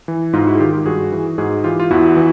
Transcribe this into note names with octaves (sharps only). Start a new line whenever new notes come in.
E3
G#2 D#4 F4
E4 F#4
G#4
D#3 F4 G4
F4 G4
G2 F#4 G#4
E3
G#2 F#4 G#4
E3 F4 G4
F4
E2 E4 F#4
E3